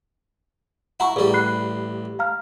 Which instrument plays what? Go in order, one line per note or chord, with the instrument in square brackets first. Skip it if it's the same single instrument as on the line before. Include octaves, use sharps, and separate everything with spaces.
[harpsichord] E4 [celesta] F#5 A#5 C#6
[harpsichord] A1 G3 [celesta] G#4 D5
[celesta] B5 F#6 C7
F5 A#5 F6